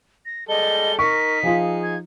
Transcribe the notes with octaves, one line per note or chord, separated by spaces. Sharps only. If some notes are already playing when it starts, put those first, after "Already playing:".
A#6
G3 G#3 A4 D#5 G7
D#4 A#4 C#6 B6
F3 F4 G#4
G#6